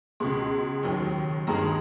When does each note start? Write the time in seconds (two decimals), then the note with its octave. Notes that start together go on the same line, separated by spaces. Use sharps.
0.20 C#2 B2 G#3 C6
0.83 D#2 D#3 F#3
1.47 G2 D#3 G#3 A#5